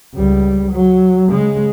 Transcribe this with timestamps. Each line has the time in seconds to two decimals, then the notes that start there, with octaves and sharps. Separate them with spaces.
0.15 C#2 G3
0.72 F#3
1.29 C#3 G#3